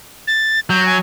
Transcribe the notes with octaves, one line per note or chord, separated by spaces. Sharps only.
A6
F#3 G6
G#5